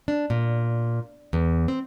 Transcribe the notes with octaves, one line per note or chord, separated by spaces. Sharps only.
D4
A#2
E2
C4